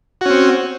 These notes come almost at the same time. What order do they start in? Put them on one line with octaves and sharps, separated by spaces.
F#4 C#4 C4